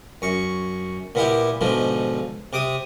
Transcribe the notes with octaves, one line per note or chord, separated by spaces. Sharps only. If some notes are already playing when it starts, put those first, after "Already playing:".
F#2 C#6
A#2 B3 E4 G4
G#2 B2 D3 F3
C3 D6 D#6